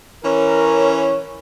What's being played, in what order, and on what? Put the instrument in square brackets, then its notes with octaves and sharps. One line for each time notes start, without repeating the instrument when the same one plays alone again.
[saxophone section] E3 C#4 [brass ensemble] A#4